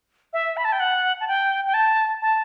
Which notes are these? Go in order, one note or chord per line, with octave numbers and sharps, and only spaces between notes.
E5
B5
A5
G5
F#5
A5
G5
G5
A5
A5